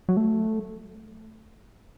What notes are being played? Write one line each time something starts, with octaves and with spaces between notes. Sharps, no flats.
F#3
A3